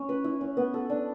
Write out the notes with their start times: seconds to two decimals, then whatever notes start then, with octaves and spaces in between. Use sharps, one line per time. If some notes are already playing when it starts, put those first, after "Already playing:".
Already playing: C#4
0.09 B4
0.24 E4
0.41 C#4
0.57 B3
0.74 A4
0.90 D4